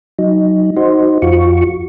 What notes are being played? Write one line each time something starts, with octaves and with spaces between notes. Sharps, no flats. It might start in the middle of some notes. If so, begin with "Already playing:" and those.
F#3 D#4
D#4 F#4 C5
F2 F4 F#4 C#6